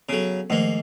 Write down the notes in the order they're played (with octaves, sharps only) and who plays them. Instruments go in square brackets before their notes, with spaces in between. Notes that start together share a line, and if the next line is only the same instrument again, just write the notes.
[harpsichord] C#3 F#3 [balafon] B3 A4
[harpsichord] G#2 A#3 [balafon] D#3 F3 A3